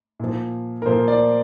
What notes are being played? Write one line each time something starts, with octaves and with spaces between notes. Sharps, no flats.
A#2 F3
A#4
A#2 F3 C5
D5